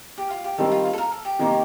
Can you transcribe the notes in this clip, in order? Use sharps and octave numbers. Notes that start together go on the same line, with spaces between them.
G4
F4
G4
D#3 G3 C4 A4
F4
F4
A4
A#4
A4
G4
C3 D#3 A#3